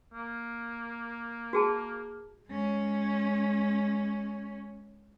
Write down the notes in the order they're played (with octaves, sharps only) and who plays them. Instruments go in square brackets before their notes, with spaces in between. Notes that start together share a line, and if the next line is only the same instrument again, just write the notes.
[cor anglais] A#3
[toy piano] F#4 G#4 A5
[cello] G#3 C#4